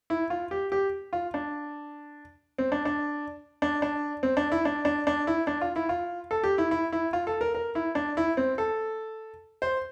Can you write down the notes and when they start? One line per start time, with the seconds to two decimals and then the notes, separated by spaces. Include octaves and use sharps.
0.10 E4
0.30 F4
0.51 G4
0.72 G4
1.13 F4
1.34 D4
2.58 C4
2.72 D4
2.85 D4
3.62 D4
3.82 D4
4.23 C4
4.37 D4
4.52 E4
4.65 D4
4.85 D4
5.07 D4
5.27 E4
5.47 D4
5.61 F4
5.76 E4
5.89 F4
6.31 A4
6.44 G4
6.58 E4
6.71 E4
6.92 E4
7.13 F4
7.27 A4
7.41 A#4
7.55 A#4
7.75 E4
7.95 D4
8.17 E4
8.37 C4
8.58 A4
9.62 C5